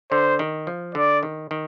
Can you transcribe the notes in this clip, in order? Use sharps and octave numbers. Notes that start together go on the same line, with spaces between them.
D3 C5
D#3
F3
D3 D5
D#3
D#3